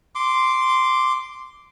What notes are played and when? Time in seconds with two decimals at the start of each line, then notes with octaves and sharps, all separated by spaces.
0.15 C6 D6